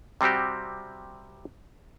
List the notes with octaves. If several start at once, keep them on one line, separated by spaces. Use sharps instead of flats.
C3 G3 C4 F#4 G4